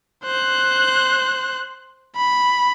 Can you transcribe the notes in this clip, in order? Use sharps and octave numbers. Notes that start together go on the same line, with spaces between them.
C5 F#6
B5